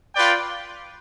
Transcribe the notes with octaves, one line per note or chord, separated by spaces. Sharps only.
F4 B4 D5 G5